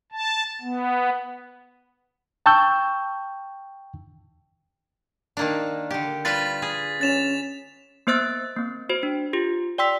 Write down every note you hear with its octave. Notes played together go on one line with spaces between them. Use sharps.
A5
B3
G5 A5 C#6 E6 G6
D#3 A#3 D4
D3 G4
G3 F4 B4 A6 B6
G#4
C#4 A6 E7 F7
A#3 B3 C5 E6 F#6 A6
A#3 C4
F#4 C5
D4
F4 G4
D5 G5 C6 E6 B6